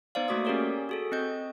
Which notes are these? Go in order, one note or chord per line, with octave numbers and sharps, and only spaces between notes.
B3 D#4 C5 D5 F5
A3 A#3 F#4 D6 D#6
C#4 G4 G#4 A#4 C#5 D5
F#4 G#4 A4
C4 D#5 G6